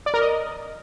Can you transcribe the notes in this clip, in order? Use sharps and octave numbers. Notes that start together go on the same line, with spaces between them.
D5
A#4
D#5